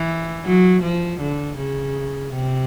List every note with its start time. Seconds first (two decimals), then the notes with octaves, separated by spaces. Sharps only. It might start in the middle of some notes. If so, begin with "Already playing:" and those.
Already playing: E3
0.45 F#3
0.83 F3
1.21 D3
1.58 C#3
2.34 C3